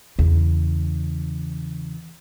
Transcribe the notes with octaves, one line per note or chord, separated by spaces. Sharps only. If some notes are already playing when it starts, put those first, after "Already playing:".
E2 C#3